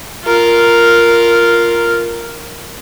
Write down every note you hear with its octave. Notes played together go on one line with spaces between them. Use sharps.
F4 A#4